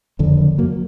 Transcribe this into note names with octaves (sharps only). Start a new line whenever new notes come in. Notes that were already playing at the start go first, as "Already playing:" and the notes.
F#1 F2 D3
F#3 A#3